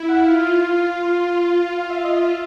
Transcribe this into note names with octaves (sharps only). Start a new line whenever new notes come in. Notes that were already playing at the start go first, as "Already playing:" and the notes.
Already playing: E4
F#5
F4 F5
F4 F5
E5
D#5
E5